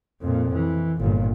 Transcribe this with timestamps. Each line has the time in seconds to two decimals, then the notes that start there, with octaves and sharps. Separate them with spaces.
0.22 F2 A#2
0.54 E3
1.00 G1 A#2